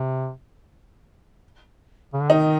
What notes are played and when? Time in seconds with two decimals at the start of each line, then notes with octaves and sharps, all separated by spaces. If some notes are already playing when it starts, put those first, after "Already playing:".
Already playing: C3
2.13 C#3
2.21 D3
2.30 D#3 D#4